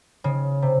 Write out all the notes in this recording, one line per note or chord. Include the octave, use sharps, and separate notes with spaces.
C#3
C3